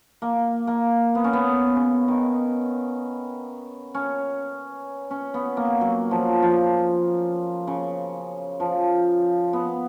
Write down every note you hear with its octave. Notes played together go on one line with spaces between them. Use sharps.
A#3
A#3
B3
C#4
B3
C#3
D#3
C#4
C#4
B3
A#3
F#3
F3
F3
C#3
F3
B3